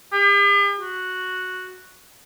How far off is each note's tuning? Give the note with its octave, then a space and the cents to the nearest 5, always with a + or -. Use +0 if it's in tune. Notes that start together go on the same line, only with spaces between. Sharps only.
G4 +45
F#4 -5